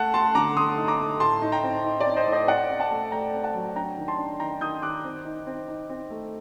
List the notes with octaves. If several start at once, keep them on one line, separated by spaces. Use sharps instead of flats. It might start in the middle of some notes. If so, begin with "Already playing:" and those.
Already playing: A3 F#5 A5
A3 A5 C6
D3 A#5 D6
A3 C6 D#6
D#4
A#5 D6
A3
A2 A5 C6
D#4
G5 A#5
C4
D#4
D5
C4
C5 D#5
A2
C5 D#5
C4 D5 F#5
C4
F#5 A5
A3
A3 G5 A#5
C4
F#5 A5
F#3
D4 G5 A#5
D#3
A5 C6
D4
D#3 G5 A#5
D#3 D#6 G6
D#3 D6 F#6
C4
D#4
C4
D#4
C4
A3